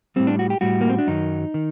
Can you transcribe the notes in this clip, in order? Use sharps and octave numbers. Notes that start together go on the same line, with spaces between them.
A2 G3 C4
D4
F#4
G4
A2 G3 F#4
A#3
C4
D4
F#2 D#3 F#3 D#4
D#3